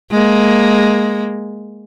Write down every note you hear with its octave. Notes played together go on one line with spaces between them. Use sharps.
G#3 A#3